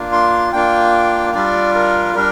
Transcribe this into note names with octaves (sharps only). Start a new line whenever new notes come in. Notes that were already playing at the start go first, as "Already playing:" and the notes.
Already playing: A#3 D4 F4
C6
A#3 D4 F4 G5
G3 D4 F4 D5
A#4
G3 D4 A#4